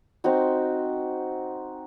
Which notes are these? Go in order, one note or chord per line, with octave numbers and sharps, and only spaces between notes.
C4 D#4 F#4